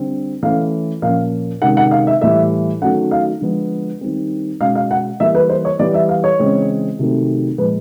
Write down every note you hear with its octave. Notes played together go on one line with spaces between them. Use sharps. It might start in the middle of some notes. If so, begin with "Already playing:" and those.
Already playing: D3 G3 C4
E3 A3 C#4 F5
A#2 F3 A#3 C#4 F5
C3 D#3 G#3 C#4 F#5
F#5
F5
E5
A2 E3 G3 E5
D#3 F#3 A3 C#4 F#5
F5
D3 F3 G#3 B3
D#3 G3 C4
B2 G#3 C#4 F5
F5
F#5
E3 G3 A#3 E5
B4
C5
C#5
E3 G3 B3 D5
E5
F5
C#5
C#3 E3 G#3 C4
C3 D#3 F#3 A3 C4
A#2 F3 G#3 B4